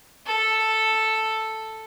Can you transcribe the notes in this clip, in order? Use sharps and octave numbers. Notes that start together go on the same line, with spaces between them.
A4